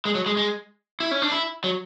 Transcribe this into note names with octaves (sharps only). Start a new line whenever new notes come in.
G#3
F#3
G#3
G#3
E4
C#4
D4
E4
F#3